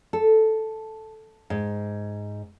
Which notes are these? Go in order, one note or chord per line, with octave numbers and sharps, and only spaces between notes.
A4
G#2